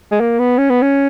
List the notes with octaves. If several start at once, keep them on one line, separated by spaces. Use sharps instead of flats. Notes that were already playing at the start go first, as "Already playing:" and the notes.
G#3
A#3
B3
C#4
B3
C#4